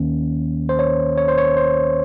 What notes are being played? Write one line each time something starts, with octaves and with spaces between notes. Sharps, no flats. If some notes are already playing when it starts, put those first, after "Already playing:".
Already playing: D#2 D#3 A#3 C#4
C5
C#5
C#5
C5
C#5
C5